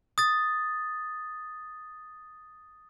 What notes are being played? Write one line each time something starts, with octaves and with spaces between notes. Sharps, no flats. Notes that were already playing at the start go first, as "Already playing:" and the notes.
D#6 A6